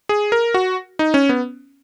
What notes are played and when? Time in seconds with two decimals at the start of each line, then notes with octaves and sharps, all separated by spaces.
0.09 G#4
0.32 A#4
0.54 F#4
0.99 D#4
1.14 C#4
1.29 B3